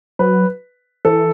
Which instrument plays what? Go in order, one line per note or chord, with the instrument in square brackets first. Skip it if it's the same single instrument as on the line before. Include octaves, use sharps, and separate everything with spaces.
[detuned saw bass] F#3 [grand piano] B4
[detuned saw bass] E3 [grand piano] A4